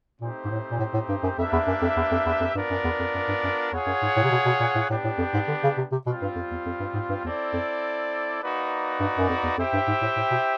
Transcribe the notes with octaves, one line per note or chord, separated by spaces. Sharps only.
A#2 A3 C4 D#4 G4 C5
G#2
A2
A#2
A2
A2
G2
F#2
F2 A#3 D4 G4 B4 E5
E2
F#2
F2
E2
F2
E2
F2
G2 B3 D4 F4 A#4 D5
F#2
E2
F2
F#2
G2
F#2
E2 F4 G#4 C#5 F#5
F#2
G#2
A2
C3
B2
B2
A#2
A2
A2 B3 D4 G4
A2
F2
G#2
D3
C#3
C3
C3
B2 G3 C4 F4
G2
F2
E2
F2
G2
G#2
G2
E2 C4 E4 A4 D5
F2
A#3 D#4 F#4 B4 D5
G2
F#2
F2
E2
F2 E4 G4 C5 E5 G5
G2
G#2
A2
A2
B2